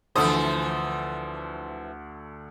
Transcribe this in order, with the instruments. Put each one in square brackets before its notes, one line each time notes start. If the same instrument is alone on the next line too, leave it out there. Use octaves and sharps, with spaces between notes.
[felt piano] D2 A4 D#6 [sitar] E3 F3 C5